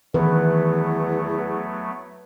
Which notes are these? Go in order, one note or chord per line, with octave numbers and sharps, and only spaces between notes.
E2 D#3 E3 F#3 A3 B3 B4